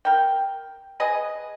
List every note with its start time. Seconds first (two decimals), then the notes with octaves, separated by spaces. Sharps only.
0.05 A#4 G5
1.00 G#4 B4 D#5